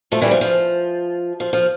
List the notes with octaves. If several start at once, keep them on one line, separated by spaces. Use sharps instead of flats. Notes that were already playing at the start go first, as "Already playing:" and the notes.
F3 A3
E3 G3
F3
F3
F3
F3